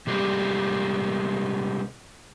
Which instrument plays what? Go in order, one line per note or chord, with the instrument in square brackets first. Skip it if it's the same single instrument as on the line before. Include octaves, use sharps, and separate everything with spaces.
[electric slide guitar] C3 G3 G#3 G4